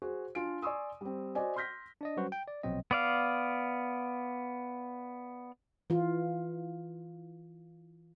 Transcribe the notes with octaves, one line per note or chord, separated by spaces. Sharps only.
F#4 G#4 C5
D4 F4 G#5 D7
D5 G#5 C6 C#6 D#6 E6
G3 C4
F#4 C5 D5 D#5 G#5
C6 F6 G6 A#6 B6
D4 D5 D#5
F#3 G3 C#4 F#4 B4 C5
G5
D5
A#1 B2 F#3 C4 D#5
B3 D5 F5
E3 F4